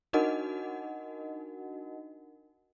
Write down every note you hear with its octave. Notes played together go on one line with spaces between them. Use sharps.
D4 D#4 F#4 A#4 D#5 F#5